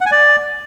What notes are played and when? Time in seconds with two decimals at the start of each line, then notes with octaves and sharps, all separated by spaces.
0.01 F#5
0.06 G#5
0.12 D5